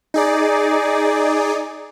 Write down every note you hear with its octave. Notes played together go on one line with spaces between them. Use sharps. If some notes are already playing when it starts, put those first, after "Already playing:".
D#4 G#4 D5